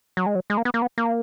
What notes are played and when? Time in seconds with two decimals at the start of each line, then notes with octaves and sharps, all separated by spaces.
0.17 F#3
0.26 G#3
0.35 F#3
0.50 G#3
0.57 A#3
0.65 B3
0.74 A#3
0.82 B3
0.98 A#3